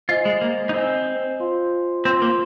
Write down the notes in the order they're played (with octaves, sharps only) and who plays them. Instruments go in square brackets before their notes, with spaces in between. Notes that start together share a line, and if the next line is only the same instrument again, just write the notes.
[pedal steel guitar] F4 [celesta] C5 D#5 G#5
[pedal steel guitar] G#3
A#3
D#4
[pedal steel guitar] C4 [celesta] C5 D#5 G#5
[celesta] F4 C5 F5 C6
[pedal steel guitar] C4 [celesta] F4 C5 F5 C6
[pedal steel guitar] A#3